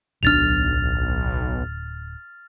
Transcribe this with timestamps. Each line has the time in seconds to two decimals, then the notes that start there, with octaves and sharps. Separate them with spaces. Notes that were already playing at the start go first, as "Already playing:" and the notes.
0.23 D1 B1 D4 F6 A6 F7